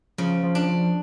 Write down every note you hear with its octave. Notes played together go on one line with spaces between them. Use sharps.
C#3 F3
F3
D4
F3